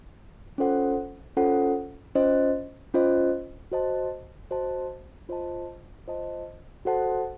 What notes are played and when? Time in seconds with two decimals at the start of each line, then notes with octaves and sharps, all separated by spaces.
0.58 C#4 F4 A4 C5 F#5
1.37 C#4 F4 A4 C5 F#5
2.15 C#4 F4 C5 D#5
2.94 C#4 F4 C5 D#5
3.72 F#4 C5 D#5 A5
4.51 F#4 C5 D#5 A5
5.29 F4 C5 D#5 A5
6.08 F4 C5 D#5 A5
6.85 F#4 A4 C5 F#5 A5